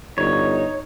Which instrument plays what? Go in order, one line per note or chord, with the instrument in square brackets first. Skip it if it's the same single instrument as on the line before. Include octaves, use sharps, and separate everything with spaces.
[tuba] G1 [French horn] D#4 [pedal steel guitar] C#5